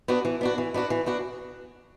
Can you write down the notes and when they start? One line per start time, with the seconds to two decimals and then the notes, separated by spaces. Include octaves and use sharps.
0.08 B3 D4 F#4
0.25 E3
0.41 B3 D4 F#4
0.58 E3
0.74 B3 D4 F#4
0.90 E3
1.06 B3 D4 F#4